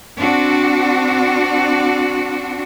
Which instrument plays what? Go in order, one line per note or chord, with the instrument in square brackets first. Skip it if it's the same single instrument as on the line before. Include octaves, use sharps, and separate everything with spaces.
[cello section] C4 D4 F#4